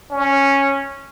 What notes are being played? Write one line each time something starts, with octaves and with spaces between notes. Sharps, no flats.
C#4